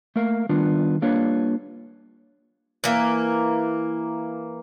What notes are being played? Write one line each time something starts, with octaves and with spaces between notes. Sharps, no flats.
A3 A#3 A#4 F5
D#3 G3 B3 D4 F4
G3 A#3 D4 F4 B4 C#5
E3 A#3